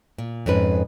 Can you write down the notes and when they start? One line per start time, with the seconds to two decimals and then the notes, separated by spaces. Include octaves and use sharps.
0.18 A#2
0.46 F2 G#2 C#4 B4